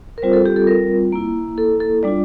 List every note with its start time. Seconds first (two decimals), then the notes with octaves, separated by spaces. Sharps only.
0.18 A#4
0.22 G3 C4 F4 C5
0.33 A4
0.46 G4
0.56 A4
0.67 A#4
1.12 A#3 E4
1.58 A4
1.80 A4
2.03 G3 D4 F4 D5